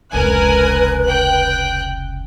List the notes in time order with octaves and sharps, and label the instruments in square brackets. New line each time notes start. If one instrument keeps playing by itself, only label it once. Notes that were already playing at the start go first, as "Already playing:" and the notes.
[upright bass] F1 C#2 [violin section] A#4 G#5 F#6 [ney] B4
[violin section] G5 F#6